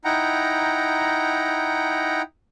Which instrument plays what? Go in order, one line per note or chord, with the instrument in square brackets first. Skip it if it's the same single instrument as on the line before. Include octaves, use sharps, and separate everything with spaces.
[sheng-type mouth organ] D#4 E4 F#5 G5 A#5